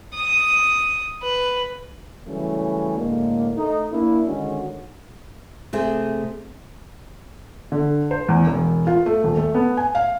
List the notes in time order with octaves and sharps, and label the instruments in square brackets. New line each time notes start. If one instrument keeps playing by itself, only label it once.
[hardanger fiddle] D#6
B4
[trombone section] C#3 E3 F#3 G3 A3 C#4
A2 D3 G#3 A#3
A3 D#4
A#3 D4 E4
D3 D#3 G#3 C#4 F#4
[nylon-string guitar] C3 A3 G#4
[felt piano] D3
C5
E2
E1
F4
A3
D#1
A3
B3
G#5
F5